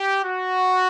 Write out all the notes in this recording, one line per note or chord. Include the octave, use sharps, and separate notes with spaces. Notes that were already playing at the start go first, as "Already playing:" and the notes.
Already playing: G4
F#4